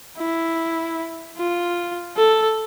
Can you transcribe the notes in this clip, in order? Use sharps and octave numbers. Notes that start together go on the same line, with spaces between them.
E4
F4
A4